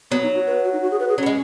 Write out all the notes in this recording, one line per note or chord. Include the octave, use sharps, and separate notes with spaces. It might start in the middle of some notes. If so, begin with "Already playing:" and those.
F#3 B3
D#4
F#4
B4
F#4
D#4
F#4
G#4
B4
G#4
F#3 B3 C#4
G#3